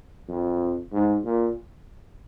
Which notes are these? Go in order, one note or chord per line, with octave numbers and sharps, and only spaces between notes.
F2
G#2
A#2